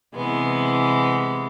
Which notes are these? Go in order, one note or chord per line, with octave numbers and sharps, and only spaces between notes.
C3 E3 G#3 B3